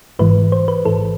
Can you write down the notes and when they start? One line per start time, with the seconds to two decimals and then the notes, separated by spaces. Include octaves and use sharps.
0.19 G#1 G#2 E3 B4
0.52 C5
0.68 B4
0.85 A1 G#2 E3 A4